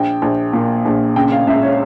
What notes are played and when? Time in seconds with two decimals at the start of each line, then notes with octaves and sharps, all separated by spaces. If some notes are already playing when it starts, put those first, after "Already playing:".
Already playing: A#1 G5
0.22 A#1
0.53 A#2
0.85 A#1
1.16 C#3 G5
1.32 F5
1.47 C#2 E5
1.63 C#5